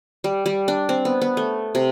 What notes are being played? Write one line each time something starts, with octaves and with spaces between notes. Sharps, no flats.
G3
G3
D4
C4
B3
B3
A3
C3